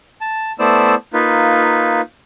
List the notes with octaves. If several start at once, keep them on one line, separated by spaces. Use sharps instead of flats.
A5
A3 B3 E4 C5 D5 E6
A#3 D#4 F4 B4